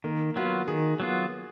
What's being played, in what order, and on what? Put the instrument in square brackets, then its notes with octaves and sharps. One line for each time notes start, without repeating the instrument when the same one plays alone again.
[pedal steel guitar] D#3 [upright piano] A#3
[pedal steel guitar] F#3 B3 F4 [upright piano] F#4
[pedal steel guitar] D#3 [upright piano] G#4
[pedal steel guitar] F#3 B3 F4